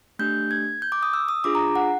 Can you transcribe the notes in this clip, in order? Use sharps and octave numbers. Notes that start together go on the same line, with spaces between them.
A3 D4 G4 G6
G#6
G6
D6
D#6
E6
D#6
D4 F4 G#4 D6
A#5
F#5